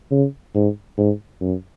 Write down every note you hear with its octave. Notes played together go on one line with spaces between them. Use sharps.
C#3
G#2
G#2
F#2